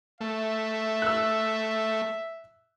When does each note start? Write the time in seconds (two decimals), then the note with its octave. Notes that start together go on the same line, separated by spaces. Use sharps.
0.21 A3 E5
1.02 E6 F#6